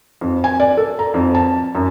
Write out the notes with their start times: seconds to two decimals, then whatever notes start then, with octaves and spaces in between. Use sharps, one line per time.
0.21 F2
0.44 G#5
0.60 D5
0.77 A4
0.99 A#5
1.14 F2
1.35 A5
1.75 F#2